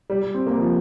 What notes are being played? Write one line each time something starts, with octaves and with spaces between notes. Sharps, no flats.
G3
G3
C4
A#3
F3